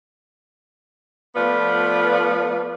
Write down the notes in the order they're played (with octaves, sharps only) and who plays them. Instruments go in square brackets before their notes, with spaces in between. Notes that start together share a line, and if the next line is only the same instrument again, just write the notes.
[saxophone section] F3 A3 B3 F4 B4 D5